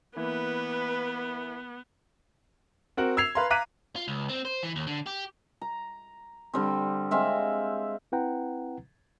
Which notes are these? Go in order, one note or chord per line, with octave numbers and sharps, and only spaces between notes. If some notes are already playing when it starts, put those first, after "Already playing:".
E3 A#3 B3 E4 B4
C4 F#4 A#4 F#5
E6 G#6 C7 F7
B4 F5 A#5 C6
F5 A#5 D6 F#6 B6 D#7
F4
C#2
C4
C5
E3
D#2
D3
G4
A#5
D3 G3 C4
G#3 C4 E5 F5
C4 E4 B4 F#5 G5 A#5